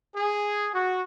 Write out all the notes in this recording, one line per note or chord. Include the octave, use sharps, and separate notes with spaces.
G#4
F#4